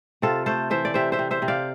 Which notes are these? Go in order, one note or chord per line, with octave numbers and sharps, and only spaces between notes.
C3 F4 A4
A3 A4 C5
E3 C5 E5
D5
C3 C5 E5
C5 E5
C3
C5 E5
C3
D5 F5